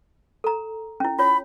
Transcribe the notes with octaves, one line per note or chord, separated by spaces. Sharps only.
A4 A#5
C#4 E4
F4 C#5 B5